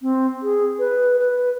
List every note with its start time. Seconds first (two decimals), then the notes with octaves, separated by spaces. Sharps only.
0.01 C4
0.43 G#4
0.79 B4
1.19 B4